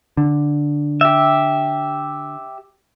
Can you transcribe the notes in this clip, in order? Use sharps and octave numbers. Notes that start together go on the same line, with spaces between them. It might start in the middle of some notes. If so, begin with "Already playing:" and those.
D3
G4 E5